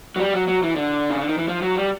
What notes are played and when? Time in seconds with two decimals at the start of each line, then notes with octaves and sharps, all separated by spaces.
0.16 F#3
0.20 G3
0.34 F#3
0.48 F#3
0.63 E3
0.76 D3
1.10 C#3
1.20 D3
1.28 D#3
1.38 E3
1.48 F3
1.62 F#3
1.76 G3